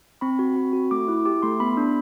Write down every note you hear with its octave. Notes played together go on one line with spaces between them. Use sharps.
C4 B5
F#4
C4
F#4
A3 D6
E4
G4 D6
A3 C6
B3 B5
D4